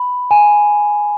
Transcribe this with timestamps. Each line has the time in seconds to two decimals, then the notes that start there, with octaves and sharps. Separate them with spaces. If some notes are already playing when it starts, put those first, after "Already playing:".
Already playing: B5
0.31 G#5